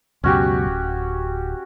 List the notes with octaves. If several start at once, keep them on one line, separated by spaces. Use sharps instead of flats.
C#2 F#2 B2 C#4 F#4 G4
D1